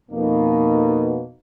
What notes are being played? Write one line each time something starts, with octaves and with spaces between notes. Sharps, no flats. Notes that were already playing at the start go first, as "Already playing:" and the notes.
F2 B2 A#3 D#4